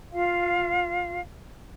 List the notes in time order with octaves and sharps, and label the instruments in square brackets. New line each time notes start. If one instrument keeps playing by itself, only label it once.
[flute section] F4 F5